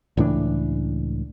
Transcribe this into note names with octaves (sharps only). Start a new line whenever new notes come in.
C#2 A2 E3 D4